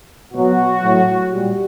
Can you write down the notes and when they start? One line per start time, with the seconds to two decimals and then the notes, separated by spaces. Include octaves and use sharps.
0.34 B2 F#3 F#4
0.82 A2 F#3
1.31 A#2 G3 G4